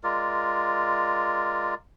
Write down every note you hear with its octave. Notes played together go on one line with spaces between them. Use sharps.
G#3 F4 A#4 D5